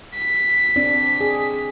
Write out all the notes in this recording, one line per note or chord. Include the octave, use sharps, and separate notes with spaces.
B6
C4 D4
G#4